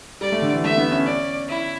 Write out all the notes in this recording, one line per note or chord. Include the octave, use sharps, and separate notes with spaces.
G3 D5
A3
D3
E3
A3 E5
B3
C#4
C#4 D5
E4